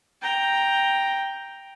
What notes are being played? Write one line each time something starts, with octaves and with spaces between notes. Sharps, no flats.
G5 A#5